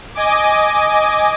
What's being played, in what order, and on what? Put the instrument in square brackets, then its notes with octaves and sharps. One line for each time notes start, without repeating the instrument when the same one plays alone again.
[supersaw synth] D#5 G#5 D6